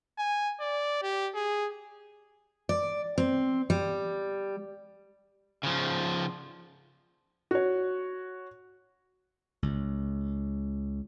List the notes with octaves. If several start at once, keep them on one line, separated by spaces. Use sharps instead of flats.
G#5
D5
G4
G#4
D5
C4
G3
C#3 F3
F#4 C#5
C#2